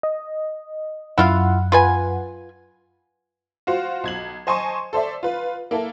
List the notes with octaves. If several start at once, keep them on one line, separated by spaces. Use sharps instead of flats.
D#5
F#2 E4 F4 F5 F#5
F4 B4 G#5
F4 F#4 C5
B1 G#6 F#7
C5 D#5 G#5 A5 C6 C#6
A4 C5 D5 E5
F4 B4
A#3 E4 A4